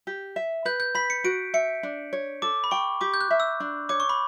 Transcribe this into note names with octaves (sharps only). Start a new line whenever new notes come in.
G4
E5
B4 G6
G6
B5 B6
C#7
F#4 D7
E5 C#7
D4
C#5
A4 D6
B5
G5 C#6
G4 D6
G6
F#6
E5
E6
D4
C#5 D6
C#6
B5